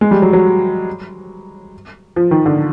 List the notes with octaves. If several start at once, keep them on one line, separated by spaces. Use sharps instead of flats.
G#3
G3
F#3
F#3
F3
D#3
D3